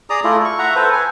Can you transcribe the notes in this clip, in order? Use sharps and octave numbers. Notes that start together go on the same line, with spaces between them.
G#4 D5 A#5 D#6
A3 E4 F4
C#6
E5 F#5 A#5
A4 B4 C5
G#5